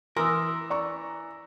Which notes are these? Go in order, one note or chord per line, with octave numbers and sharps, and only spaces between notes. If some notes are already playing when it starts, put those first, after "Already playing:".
E3 A#4 C6 D#6 E6
D5 A#5 C#6